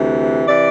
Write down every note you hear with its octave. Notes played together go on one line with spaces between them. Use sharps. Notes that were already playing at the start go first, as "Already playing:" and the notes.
Already playing: D2 C3 E3
C3 E3 D5